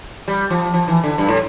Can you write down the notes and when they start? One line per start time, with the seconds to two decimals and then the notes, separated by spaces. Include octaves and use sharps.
0.28 G3
0.50 F3
0.74 F3
0.88 E3
1.04 D3
1.18 G2
1.29 A2